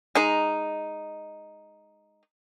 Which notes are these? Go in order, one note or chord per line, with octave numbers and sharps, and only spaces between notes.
G#3 D#4